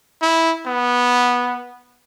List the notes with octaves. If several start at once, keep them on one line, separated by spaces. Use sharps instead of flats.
E4
B3